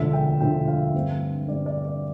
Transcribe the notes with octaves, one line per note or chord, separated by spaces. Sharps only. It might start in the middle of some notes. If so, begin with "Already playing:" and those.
Already playing: E1 D2 D3 F3 A3 E5
G5
E1 D2 D3 F3 A3 G5
F5
G2 D3 A3 C4
G2 D3 A3 C4 D5
D5
D5